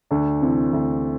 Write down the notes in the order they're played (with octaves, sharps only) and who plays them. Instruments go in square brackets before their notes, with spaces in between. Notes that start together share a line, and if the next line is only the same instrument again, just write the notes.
[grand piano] D2 D4
C3 E3 C4
D2